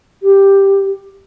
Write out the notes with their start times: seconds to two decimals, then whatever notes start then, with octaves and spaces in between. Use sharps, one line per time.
0.22 G4